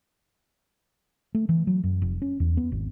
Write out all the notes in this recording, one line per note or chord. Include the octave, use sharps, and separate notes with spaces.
A3
E3
F#3
F#2
F1
C#4
E2
B3
G#1